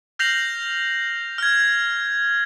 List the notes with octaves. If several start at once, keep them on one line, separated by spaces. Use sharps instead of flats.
F6 G6 A#6 C7 F7 F#7
F6 G#6